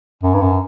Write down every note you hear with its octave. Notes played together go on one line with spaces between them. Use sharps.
F#2
G2
F#2